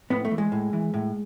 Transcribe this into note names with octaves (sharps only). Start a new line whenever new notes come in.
A2 B3
A3
E3
G#3
A2
E3
A2